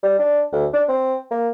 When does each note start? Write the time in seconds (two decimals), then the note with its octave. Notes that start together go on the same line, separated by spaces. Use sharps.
0.03 G3
0.19 D4
0.53 D2
0.73 D4
0.89 C4
1.31 A#3